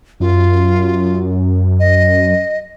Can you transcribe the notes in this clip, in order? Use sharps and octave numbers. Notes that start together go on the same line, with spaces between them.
F#2 F4
D#5